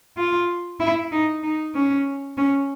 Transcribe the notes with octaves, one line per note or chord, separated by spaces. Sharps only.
F4
E4
D#4
D#4
C#4
C#4